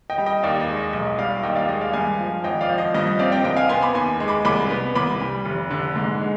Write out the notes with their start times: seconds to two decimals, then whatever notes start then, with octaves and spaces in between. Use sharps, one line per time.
0.10 D#5 G5
0.18 G3
0.26 D#5 G5
0.43 D#2 D5 F5
0.60 D#5
0.68 G#3
0.77 D#5
0.93 B1 D#5
1.18 G3 D5 F5
1.43 D#2 D#5 G5
1.56 D5 F5
1.68 G#3 D#5
1.81 D5 F5
1.93 G2 F5 G#5
2.19 F3
2.44 G#1 D#5 G5
2.61 D5 F5
2.69 F3
2.78 D#5
2.95 G2 D#5
3.07 D#5
3.19 C4 D5 F5
3.32 D#5 G5
3.44 C2 D#5 G5
3.57 F5 G#5
3.69 B3 G#5 C6
3.82 B5 D6
3.95 D#2 G#5 C6
4.20 G#3
4.28 B5 D6
4.45 C2 B5 D6
4.70 B3
4.95 C2 B5 D6
5.21 G3
5.45 F1
5.70 D3
5.96 G#2
6.21 G#3